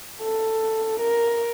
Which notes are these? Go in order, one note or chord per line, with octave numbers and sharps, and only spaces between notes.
A4
A#4